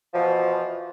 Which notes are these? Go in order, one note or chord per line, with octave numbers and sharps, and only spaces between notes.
B2 E3 F3